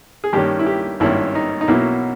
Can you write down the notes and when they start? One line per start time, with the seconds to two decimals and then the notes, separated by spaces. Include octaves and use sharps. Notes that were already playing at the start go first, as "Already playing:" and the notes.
0.24 G#4
0.33 G2 D#3 A#3 C#4 G4
0.59 E4
0.66 G4
1.00 G#1 G2 D#3 A#3 C#4 E4
1.35 D#4
1.61 D#4
1.68 B1 B2 A#3 C#4 E4